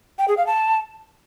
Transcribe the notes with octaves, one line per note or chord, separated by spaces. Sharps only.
G5
G#4
F5
A5